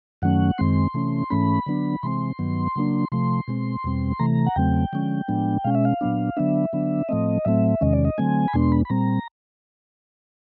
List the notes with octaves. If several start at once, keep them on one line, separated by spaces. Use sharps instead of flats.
F#2 D#3 F#3 A3 C#4 F#5
F#2 D#3 G#3 C4 C6
C3 E3 A3 C#4
G#2 E3 A3 C#4 B5
D3 F#3 B3 D4
C3 E3 G#3 C4 C6
G2 D#3 F#3 B3
C#3 F#3 A#3 D4
C3 F3 A3 C6
B2 G#3 C4
E2 B2 G3 C4
C3 E3 A3 A#5
F#5
E2 C#3 F#3 A3 C4 G5
D3 F3 G#3 C#4
A2 F3 G#3 B3 D4
B2 G#3 C#4 F5
E5
F5
A#2 F#3 B3 D4
D3 F#3 B3 D4 E5
D3 F#3 B3 D4
A2 F3 A3 C4 D#5
A2 F#3 A3 C4 E5
E2 C3 D#3 G#3 C#4 D#5
D5
D#5
D3 F#3 A3 C4 G#5
B5
E2 B2 G#3 B3 D4 C6
B5
B5
A#2 G3 C4 A#5